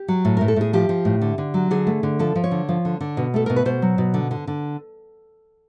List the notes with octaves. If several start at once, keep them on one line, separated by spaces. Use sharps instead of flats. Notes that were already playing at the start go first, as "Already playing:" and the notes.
Already playing: G4
F#3
A2
A2 A#4
A4
A2 G#4
F3 G4
F3
A2
D3
D3
F#3
D3 G#4
A3
D3
F3 A4
F3
C#5
D3
F3
D3
D3
B2
A3 A4
B2 A#4
B4
B2 C5
F#3
B2
D3
D3
D3